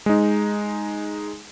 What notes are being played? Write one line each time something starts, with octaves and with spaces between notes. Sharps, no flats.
G#3 D#4